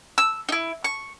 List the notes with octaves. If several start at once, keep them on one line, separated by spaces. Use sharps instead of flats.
E6
D#4 E4
C#6